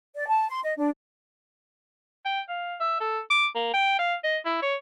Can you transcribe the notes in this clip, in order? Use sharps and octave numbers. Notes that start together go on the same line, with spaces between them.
D5
A5
C6
D#5
D4
G5
F5
E5
A4
D6
A#3
G5
F5
D#5
E4
C#5